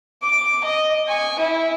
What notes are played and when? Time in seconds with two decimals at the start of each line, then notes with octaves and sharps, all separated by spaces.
0.22 D6
0.64 D#5
1.07 G#5 C#6
1.39 E4